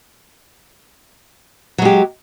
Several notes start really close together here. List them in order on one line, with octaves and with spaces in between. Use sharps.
F#3 G#3 G4